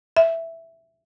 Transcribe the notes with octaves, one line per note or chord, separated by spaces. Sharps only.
E5